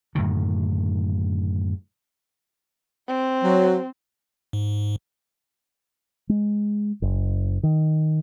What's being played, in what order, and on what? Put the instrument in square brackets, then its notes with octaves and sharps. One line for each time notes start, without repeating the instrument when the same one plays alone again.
[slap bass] F#2 A2 D3 D#3
[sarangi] C4
[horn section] F#3
[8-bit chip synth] G#2
[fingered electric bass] G#3
F#1
D#3